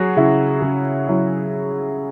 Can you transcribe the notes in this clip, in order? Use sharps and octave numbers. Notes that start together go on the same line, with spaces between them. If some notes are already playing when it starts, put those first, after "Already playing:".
Already playing: F#3 F#4 G#4
C#3 E4
C#3
F#3 E4